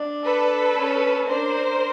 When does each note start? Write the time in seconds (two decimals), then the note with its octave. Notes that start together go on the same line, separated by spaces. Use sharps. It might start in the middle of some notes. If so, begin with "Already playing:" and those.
Already playing: D4
0.24 A4 B4
0.76 C#4
1.28 D4 A#4 C5